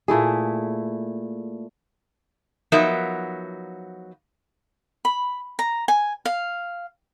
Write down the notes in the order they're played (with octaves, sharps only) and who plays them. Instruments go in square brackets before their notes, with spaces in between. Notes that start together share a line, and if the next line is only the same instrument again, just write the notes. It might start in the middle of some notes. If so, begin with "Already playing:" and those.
[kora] A#2 A3 E4 G#4
[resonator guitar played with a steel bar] F3 F#3 B3 D#4 A#4 E5
[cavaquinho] B5
A#5
G#5
F5